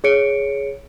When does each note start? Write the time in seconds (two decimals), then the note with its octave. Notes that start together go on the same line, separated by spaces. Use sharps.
0.04 G#4 C#5 C#7 D7